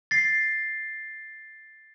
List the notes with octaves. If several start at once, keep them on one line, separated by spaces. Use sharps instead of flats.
A6 C7